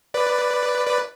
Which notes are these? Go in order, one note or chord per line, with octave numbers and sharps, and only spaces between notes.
B4 D5
B4 D5